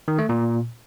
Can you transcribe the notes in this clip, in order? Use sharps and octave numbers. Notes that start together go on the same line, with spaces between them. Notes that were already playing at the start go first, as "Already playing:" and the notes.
D#3
A3
A#2